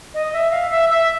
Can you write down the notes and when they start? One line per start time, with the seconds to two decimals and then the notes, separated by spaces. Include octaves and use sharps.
0.14 D#5
0.33 E5
0.51 F5
0.70 E5
0.89 E5